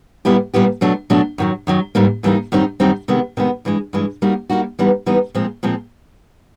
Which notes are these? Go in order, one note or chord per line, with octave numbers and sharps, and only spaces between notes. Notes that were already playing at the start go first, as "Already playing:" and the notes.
A#2 G3 B3 E4 G4
A#2 G3 B3 E4 G4
B2 F#3 A3 D4
B2 F#3 A3 D4
F#2 D#3 F#3
F#2 D#3 F#3
G#2 E3 G3 A#3 D#4
G#2 E3 G3 A#3 D#4
F#2 D#3 G3 C4 D#4
F#2 D#3 G3 C4 D#4
C3 D#3 G#3 B3
C3 D#3 G#3 B3
G2 E3 G#3
G2 E3 G#3
G3 A#3 D#4 F#4
G3 A#3 D#4 F#4
E3 G3 B3 D#4
E3 G3 B3 D#4
A#2 F3 G#3 C4
A#2 F3 G#3 C4